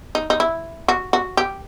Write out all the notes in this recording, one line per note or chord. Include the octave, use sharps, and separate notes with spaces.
D#4
D#4
E4
F#4
F#4
G4